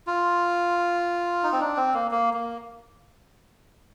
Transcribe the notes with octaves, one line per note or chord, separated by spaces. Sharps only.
F4
D#4
C4
D4
C4
A#3
A#3
A#3